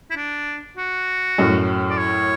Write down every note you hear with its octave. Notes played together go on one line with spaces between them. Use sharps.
E4
D4
F#4
F#2 A2
D5
C#5